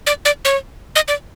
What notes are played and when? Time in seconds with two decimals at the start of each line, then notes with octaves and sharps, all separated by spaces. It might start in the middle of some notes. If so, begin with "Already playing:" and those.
0.07 D5
0.25 D5
0.45 C#5
0.96 D#5
1.08 D5